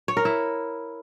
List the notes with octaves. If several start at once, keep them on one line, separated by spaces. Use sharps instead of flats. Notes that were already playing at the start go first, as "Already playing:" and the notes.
C#5
A#4
E4